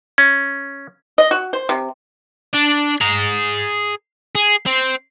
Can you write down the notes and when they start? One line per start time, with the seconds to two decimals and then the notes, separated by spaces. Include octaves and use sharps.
0.18 C#4
1.18 D#5
1.31 F#4
1.53 C5
1.69 C3
2.53 D4 D5
3.01 G#4 A#5
4.35 G#4
4.66 C4